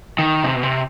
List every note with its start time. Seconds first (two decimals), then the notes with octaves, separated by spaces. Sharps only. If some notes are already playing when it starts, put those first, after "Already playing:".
0.19 D#3
0.44 C3
0.56 B2
0.63 C3